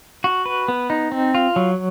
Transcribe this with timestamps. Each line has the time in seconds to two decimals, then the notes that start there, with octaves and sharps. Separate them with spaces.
0.24 F#4
0.46 B4
0.68 B3
0.90 D#4
1.12 C4
1.35 F4
1.56 F#3